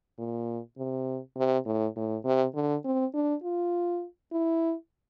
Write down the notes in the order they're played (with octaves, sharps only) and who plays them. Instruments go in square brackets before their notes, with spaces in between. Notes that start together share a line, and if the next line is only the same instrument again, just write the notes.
[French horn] A#2
C3
C3
A2
A2
C3
D3
C4
D4
F4
E4